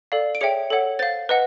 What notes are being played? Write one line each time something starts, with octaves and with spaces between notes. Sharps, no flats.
A4 D5 F5
D7
G#4 C#5 E5 G5 C#7
A4 C#5 F#5
C5 F5 A6
B4 D#5 F#5